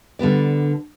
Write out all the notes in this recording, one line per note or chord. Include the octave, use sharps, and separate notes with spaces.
D3 G3 B3 D5